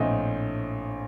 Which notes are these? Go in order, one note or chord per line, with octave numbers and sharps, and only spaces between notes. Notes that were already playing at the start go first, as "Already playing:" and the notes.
Already playing: A#1 A2 A3 C4 D#5